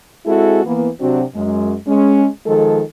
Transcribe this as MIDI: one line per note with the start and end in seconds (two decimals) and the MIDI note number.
0.26 0.65 56
0.26 0.65 60
0.26 0.65 64
0.26 0.65 66
0.26 0.65 68
0.26 0.65 69
0.65 0.89 52
0.65 0.89 58
0.65 0.89 59
1.01 1.23 48
1.01 1.23 54
1.01 1.23 60
1.01 1.23 62
1.01 1.23 66
1.35 1.74 42
1.35 1.74 56
1.87 2.26 56
1.87 2.26 61
2.46 2.81 51
2.46 2.81 53
2.46 2.81 56
2.46 2.81 69